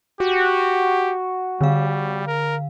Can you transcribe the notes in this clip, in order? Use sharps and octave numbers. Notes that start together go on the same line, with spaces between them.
F#4 G4
D3 G3 F5
A#4